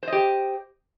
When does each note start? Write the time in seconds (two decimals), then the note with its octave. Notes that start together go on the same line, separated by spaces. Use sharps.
0.03 C5
0.08 D#5
0.12 G4